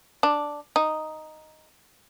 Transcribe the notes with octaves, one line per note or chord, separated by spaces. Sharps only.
D4
D#4